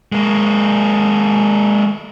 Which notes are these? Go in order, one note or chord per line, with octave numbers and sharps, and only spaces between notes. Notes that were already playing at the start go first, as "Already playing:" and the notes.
G#3 A#3